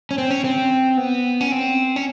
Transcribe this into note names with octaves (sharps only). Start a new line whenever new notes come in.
C#4
C4
C#4
C4
B3
C#4
C4
C#4